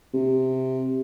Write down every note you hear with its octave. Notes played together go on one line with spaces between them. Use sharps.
C3